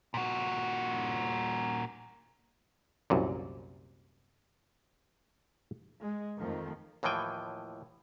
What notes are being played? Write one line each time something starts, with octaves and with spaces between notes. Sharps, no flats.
A#2 F#4
C2 F#2 A#2
G#3
F2 D#3 F3 A3
D#2 A2 E3 F3 G5 G#5